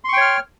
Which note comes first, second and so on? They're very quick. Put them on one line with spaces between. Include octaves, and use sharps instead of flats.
C6 C#6 G5 C#5 F6